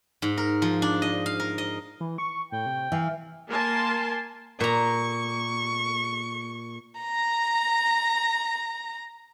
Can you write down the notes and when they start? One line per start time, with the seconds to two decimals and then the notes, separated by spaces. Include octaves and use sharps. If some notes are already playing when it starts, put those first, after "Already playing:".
0.22 G#2
0.38 A#4
0.62 F3
0.82 D4
1.02 D#5
1.26 F5
1.40 A#4
1.58 D#5
2.00 E3
2.18 C#6
2.52 A2 G5
2.66 C3
2.92 E3 F5
3.50 A#3 A#4 G#5 A5 C6
4.60 A#2 A#5 C#6
7.00 A#5 A#6